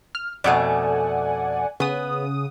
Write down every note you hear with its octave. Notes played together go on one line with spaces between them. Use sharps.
F6
F2 B2 A3 D5 F#5 G#5
C#3 B3 D#6